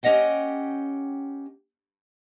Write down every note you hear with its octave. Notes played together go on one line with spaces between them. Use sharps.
A#3 C#4 G4 D#5 F#5 G5